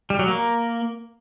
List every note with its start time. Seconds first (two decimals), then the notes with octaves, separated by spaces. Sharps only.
0.10 G3
0.19 F#3
0.28 A#3